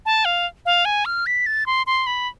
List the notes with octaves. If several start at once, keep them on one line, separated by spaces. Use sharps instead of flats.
A5
F5
F5
G#5
F6
B6
A6
C6
C6
B5